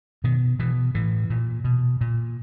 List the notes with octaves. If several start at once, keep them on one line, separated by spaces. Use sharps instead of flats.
B2 D#3
B2 E3
A2 E3
A#2
B2
A#2